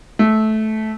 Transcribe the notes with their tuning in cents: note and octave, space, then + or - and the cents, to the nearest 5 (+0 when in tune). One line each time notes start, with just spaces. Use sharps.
A3 -15